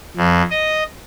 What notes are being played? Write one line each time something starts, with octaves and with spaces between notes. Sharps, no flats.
F2
D#5